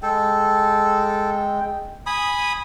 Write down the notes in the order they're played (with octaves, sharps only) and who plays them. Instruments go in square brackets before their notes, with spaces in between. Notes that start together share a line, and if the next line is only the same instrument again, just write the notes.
[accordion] G#3 G5 [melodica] A4
[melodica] G#5 B5 D#6